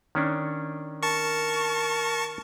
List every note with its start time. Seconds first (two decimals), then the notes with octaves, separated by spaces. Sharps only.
0.15 D#3 C#4 D4
1.03 A#4 A5 C#6